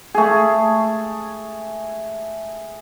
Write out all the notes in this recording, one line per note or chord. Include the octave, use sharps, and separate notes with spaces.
A3 G#4